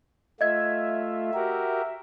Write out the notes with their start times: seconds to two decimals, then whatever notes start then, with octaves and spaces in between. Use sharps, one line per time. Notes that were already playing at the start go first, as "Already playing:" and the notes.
0.41 A3 F4 D#5 E5 G#6
1.34 F#4 G4 A#4